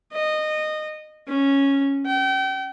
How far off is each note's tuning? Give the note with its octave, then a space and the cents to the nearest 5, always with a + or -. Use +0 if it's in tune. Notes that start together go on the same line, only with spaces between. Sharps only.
D#5 -20
C#4 -5
G5 -35